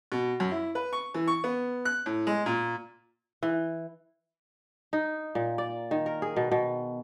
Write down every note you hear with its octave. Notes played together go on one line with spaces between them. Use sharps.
B2
F#2
E4
B4
C#6
E3
C#6
B3
F#6
A2
G#3
A#2
E3
D#4
A#2
D5
D#3
A#4
G#4
B2
B2